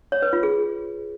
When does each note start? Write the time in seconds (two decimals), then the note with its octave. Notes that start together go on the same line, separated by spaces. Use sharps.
0.12 C#5
0.22 B4
0.33 F4
0.43 G#4